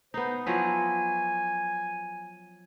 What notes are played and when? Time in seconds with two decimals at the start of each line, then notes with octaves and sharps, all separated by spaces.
0.14 B3 D#4 C5
0.46 F3 F#3 E4 G#5